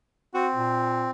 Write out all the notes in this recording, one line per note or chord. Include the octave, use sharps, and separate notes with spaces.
C4 F#4
A#2